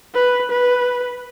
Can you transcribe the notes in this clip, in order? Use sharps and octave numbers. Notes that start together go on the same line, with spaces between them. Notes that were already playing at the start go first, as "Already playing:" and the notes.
B4
B4